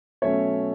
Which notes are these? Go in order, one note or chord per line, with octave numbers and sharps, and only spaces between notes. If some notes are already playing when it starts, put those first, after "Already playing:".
B2 F#3 A3 C#4 C#5 E5